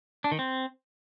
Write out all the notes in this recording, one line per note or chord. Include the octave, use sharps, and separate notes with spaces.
D4
D#3
C4